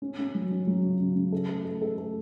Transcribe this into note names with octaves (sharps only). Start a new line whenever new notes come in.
C#4
C#4
F#3
C#4
F#3
C#3
C#3
C#3
A4
A3
A3
A4
A3